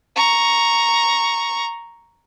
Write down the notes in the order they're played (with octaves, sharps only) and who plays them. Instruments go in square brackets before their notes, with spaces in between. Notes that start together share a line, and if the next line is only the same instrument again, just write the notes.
[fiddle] A#5 C#6